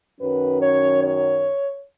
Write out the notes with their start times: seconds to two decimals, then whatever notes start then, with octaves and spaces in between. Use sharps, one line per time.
0.20 F#2 D#3 F#3 C#4 B4
0.62 C#5
1.03 C#5